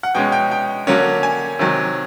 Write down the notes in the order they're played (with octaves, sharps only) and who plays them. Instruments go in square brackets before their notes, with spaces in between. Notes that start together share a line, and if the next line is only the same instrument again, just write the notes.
[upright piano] F#5
B2 G#3 C#4 G5
G5
G5
D3 F#3 A#3 C#4
G#5
C3 D#3 F#3